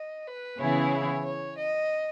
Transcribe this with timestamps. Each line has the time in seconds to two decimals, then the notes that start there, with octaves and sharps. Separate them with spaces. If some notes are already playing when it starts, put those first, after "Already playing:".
Already playing: D#5
0.27 B4
0.59 C#3 E3 B3 E4 G#4 C#5
1.25 C#5
1.57 D#5